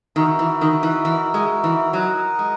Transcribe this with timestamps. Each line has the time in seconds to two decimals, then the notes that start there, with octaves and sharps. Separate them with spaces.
0.16 D#3 D#4 F#4 A#4 E5
0.39 E3
0.61 D#3
0.83 E3
1.05 E3
1.34 G#3
1.64 E3
1.93 F#3 D#4 A#4 D#5 F#5
2.39 G#3